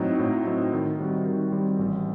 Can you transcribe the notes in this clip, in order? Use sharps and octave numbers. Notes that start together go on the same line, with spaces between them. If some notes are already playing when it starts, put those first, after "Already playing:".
Already playing: A2 F#3 C4 D#4
A2
F#3 C4 D#4
D#3
G3 C4 F#4
D#3
G3 C4 F#4
A1